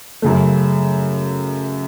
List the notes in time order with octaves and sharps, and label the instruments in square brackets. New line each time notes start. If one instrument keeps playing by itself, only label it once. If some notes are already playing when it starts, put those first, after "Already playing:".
[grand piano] F#2 C#3 A3